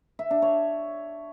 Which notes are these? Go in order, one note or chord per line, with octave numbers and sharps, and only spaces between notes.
E5
D4
C#5